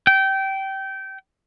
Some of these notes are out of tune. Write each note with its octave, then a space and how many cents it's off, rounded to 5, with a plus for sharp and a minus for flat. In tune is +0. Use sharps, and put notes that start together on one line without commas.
G5 -20